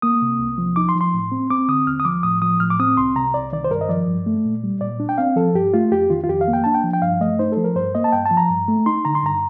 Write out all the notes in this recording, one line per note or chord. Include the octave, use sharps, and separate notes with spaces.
A#3 D#6
C3
C2
F3
D#4 D6
C6
F3
C6
A2
C4
C4 D6
D3 D#6
D#2 F6
D#6
F3 D6
A2 D#6
F3 D#6
A2 F6
D6
C4 D#6
C2 C6
C3 A#5
C2 D5
D#3 D5
C5
G2 A#4
D#5
F3 D5
G2
A3
A#2
G3
A#2 D5
D4
G5
C4 F5
F3 A4
G2 G4
A3 F4
F2 G4
D#3 F4
F4
F2 G4
F5
A#3
G5
D4 A5
G5
F3
G5
G2 F5
A3 D#5
D#4 C5
F3 A4
A#4
G2 C5
A#3 D#5
A5
G2 G5
A5
F3
A#5
G2
A3
D#4 C6
D3 A#5
C6
G2 A#5